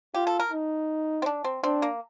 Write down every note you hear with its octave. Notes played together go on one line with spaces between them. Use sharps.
F4 G4
A4
A#4
D#4
C4
D4
C4
C4 D4
A#3